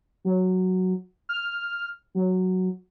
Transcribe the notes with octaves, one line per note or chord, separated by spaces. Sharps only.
F#3
F6
F#3